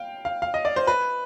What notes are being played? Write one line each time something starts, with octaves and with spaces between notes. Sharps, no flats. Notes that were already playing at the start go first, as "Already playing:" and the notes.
Already playing: F5 G5
F5
F5
D#5
D5
C5
B4